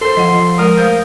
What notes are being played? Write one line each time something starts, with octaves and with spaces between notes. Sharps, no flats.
A4 C5 C6
F3 D#5 F#5
F3 G#3 A#4 D#6
A3 C5 F5 G6